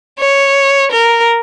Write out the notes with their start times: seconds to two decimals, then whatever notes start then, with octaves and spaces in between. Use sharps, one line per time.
0.19 C#5
0.91 A#4